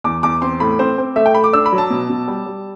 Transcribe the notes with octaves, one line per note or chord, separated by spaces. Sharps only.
E2 D6
E2 D6
C4 C6
A2 B5
C4 C5
C4
A3 E5
G5
A3 B5
D6
D4 E6
B5
F#3
A5
B2
B2
G3
G3